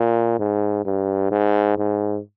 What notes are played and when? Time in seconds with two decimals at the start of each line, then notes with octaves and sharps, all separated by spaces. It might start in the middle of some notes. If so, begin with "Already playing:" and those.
Already playing: A#2
0.39 G#2
0.86 G2
1.31 G#2
1.78 G#2